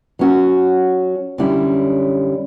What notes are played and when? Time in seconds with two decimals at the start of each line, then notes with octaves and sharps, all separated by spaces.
0.19 F#3 C#4 F#4
1.38 F#2 D3 G3 C#4 E4